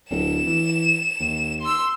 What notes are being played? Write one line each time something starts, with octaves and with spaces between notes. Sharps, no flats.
D1 E7
E3
D#2
C6 E6